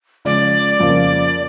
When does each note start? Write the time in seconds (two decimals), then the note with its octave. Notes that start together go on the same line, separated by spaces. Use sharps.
0.25 C#3 F3 G#3 D5
0.80 F2 C#3 F3 A#3